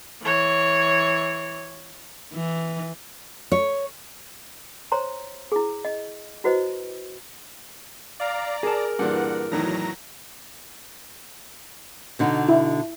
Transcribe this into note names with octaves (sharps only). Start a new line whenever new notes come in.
E3 C#5
E3
C#5
C5 C#5 A#5 C6
E4 G#4
D#5
E4 F#4 B4 C5 D#5
D5 F5 A#5
G#4 A#4 A5
G2 A#2 E3 F#5
E2 A2 D#3 F#3 A#5 A#6
B2 D3 D#4
E4